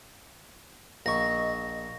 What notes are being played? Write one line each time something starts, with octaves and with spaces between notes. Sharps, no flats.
A#1 D#5 C#6 A#6